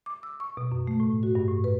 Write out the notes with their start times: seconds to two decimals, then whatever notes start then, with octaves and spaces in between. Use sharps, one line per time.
0.06 D6
0.23 E6
0.40 C#6
0.57 B2
0.72 F#2
0.87 A3
1.00 A2
1.23 F#4
1.35 G2
1.48 A2
1.64 B4